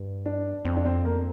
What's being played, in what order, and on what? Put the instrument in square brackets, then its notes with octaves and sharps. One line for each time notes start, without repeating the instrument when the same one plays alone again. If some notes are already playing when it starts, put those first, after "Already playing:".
Already playing: [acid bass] G2
[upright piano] D4
[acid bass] F2 [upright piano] C4
[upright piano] D4
C4
A#3